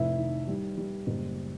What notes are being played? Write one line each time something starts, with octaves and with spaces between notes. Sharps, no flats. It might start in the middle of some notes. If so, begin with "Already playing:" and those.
Already playing: F1 E4 E5
D#3
G3
G3
F#1